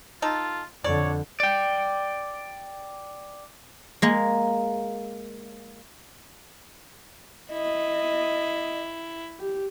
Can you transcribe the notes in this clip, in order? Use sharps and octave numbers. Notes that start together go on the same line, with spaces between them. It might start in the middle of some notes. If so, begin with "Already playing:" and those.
D#4 F4 A4
F2 D3 C#5 D5
D5 G5
G#3 A#3
E4 D#5
G4